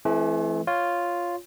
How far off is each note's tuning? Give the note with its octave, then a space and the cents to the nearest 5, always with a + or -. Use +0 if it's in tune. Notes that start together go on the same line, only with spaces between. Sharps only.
E3 +10 A3 -40 C4 +0
F4 +0 C#5 +0